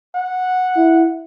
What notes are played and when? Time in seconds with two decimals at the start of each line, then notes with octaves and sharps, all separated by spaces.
0.15 F#5
0.76 E4